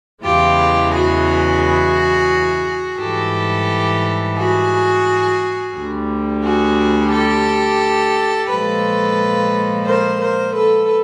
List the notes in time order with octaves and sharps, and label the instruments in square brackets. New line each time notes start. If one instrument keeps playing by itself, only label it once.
[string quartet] E2 C#3 E3 G#3 F4 G4
F#4 G#4
G#2 E3 G3 G4 A4
F#4 G#4
D2 D3 G3
F#4 G#4
G4 A4
A#2 F3 G#3 A4 B4
A#4 C5
A#4 C5
A4 B4